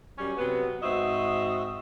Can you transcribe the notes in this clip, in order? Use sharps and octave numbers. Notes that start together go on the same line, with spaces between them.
F#2 G3 C#4
C3 F#3 B3
G#2 C4 F#4 D#5 E5